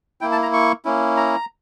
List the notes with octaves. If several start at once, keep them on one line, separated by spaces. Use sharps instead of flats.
A#3 E4 G5
A5
A#5
C#6
A#3 C#4 E4
A#5